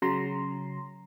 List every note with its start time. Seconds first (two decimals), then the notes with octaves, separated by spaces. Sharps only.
0.02 C#3 F#3 A#5 C6